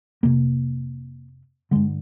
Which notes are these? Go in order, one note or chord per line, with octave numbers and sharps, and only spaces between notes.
F2 C3 A#3
G2 D3 G#3